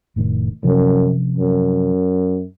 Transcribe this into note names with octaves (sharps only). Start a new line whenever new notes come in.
F1 A2 D#3
F#2 C3 F3 C#4
F#2